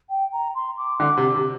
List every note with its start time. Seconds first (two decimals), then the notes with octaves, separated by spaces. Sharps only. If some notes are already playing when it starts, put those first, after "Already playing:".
0.10 G5
0.32 A#5
0.55 C6
0.77 D6
1.00 D3 D6
1.17 C3
1.23 D6
1.35 C3